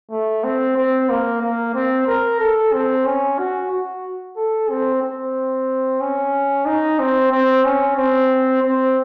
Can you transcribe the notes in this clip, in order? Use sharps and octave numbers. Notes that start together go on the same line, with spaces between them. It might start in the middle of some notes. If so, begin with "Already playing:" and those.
A3
C4
C4
A#3
A#3
C4
A#4
A4
C4
C#4
F#4
F#4
A4
C4
C4
C#4
D#4
C4
C4
C#4
C4
C4